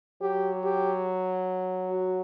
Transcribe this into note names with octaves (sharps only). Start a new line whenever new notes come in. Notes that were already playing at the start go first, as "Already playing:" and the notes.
F#3 G4
G4
F#4